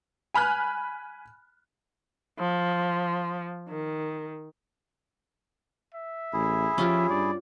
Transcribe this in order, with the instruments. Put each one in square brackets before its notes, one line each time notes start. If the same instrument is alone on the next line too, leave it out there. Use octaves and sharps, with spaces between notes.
[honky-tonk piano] G#5 B5 F6 F#6
[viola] F3
D#3
[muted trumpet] E5
[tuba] A1 [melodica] E4 G#4
[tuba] F3 [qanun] C#4 F4 G4
[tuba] G2 [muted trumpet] D5